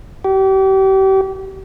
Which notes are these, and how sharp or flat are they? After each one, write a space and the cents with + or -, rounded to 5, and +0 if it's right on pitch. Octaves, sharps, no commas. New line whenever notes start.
G4 -35